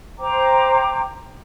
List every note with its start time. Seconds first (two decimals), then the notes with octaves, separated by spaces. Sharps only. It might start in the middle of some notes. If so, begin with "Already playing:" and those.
0.18 C5 G5 A#5 D6